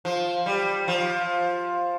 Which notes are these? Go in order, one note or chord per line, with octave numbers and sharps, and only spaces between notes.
F3
G3
F3